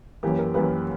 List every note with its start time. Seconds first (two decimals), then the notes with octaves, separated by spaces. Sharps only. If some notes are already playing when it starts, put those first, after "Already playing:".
0.23 F#2 E3 A#3 G4
0.38 A#4
0.54 F#2 E3 A#3 G4 B4